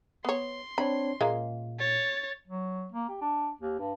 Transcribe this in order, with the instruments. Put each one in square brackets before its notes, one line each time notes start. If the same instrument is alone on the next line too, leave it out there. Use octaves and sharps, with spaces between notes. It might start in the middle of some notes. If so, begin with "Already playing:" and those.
[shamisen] B3 C#5 [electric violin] C6
[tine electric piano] C4 D4 C#5 [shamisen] B5
[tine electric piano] A#2 [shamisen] G#3 A#3 C#4
[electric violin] C#5 A6
[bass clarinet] F#3
A#3
G4
D4
D#2
G2